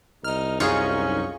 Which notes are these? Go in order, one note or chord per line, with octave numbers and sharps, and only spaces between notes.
C2 D#4 F6
F#2 C#4 D#4 F4 G#4 C#6